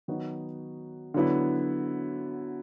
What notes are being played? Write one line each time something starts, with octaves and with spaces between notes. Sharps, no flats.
D#3 F#3 B3 D#4 F#4
D3 F#3 B3 E4